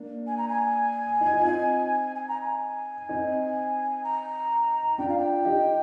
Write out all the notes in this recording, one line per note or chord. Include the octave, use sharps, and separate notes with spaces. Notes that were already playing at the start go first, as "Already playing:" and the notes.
Already playing: A#3 D4
G#5
A#5
G#5
D#4
F4
C4 D#4
G#5
A#5
G#5
C4 D#4
A#5
D4 F4 G5
F5
G5
D#4 G4